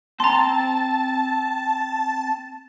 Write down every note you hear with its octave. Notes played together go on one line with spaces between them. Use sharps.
C4 G5 A5 A#5 C6